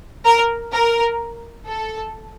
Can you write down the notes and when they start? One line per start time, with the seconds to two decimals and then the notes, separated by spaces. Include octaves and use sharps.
0.25 A#4
0.72 A#4
1.68 A4